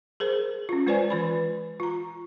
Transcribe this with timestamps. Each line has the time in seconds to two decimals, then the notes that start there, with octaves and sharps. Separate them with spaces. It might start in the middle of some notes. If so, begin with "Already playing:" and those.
0.20 G#4 A#4 C5
0.69 C#4 F4
0.86 G#3 F4 B4 C5 D5 G#5
1.10 E3 B4 B5
1.80 F4 A#5